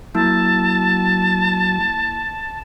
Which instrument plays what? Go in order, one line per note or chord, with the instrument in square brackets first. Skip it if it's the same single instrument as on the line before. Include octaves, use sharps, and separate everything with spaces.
[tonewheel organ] F#3 [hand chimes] A#3 E4 E6 [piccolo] A5